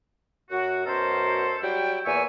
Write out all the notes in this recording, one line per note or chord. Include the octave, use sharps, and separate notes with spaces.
F#2 F#4
F#2 B2 A4 A#4 C5
F#3 G3 E4 G5
E2 A#2 C#5 E5 G#5